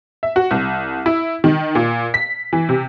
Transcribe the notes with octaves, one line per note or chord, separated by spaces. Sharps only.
E5
F#4
C2
E4
D#3
A#2
B6
E3
C3